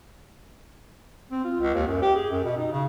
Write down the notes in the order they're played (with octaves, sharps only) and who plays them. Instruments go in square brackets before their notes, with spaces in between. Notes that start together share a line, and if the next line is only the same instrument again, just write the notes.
[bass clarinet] C4
F4
C#2
D#2
F#2
G4
G#4
F#2
B2
D#4
C#3